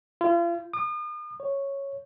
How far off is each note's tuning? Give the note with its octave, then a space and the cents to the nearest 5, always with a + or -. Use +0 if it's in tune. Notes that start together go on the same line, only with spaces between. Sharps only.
F4 -40
D#6 -40
C#5 -5